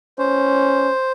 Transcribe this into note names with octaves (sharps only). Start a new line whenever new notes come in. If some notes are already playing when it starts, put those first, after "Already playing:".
C#4 C5